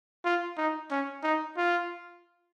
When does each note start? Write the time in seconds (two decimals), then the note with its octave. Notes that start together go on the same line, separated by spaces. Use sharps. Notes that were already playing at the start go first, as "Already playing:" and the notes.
0.25 F4
0.58 D#4
0.91 C#4
1.24 D#4
1.58 F4